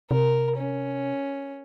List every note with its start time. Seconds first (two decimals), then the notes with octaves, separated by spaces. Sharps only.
0.11 C3 A#4
0.57 C#4